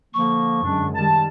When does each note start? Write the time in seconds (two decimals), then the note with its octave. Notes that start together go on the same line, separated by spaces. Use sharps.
0.14 D3 F3 A#3 C#6
0.63 F#2 D3 G#3 D4
0.95 D#3 G3 A5